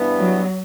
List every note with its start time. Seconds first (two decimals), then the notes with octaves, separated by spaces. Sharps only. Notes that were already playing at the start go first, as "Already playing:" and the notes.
Already playing: G2 E3 B3
0.18 F#3